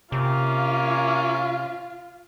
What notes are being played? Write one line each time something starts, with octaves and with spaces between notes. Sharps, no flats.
C3 A#3 C#4 F4